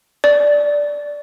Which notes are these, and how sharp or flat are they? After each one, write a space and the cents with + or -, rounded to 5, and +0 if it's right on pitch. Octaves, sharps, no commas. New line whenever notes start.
D5 -5